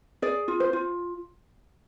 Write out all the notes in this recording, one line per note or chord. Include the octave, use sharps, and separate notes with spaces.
G#4 D5
F4
C5
F4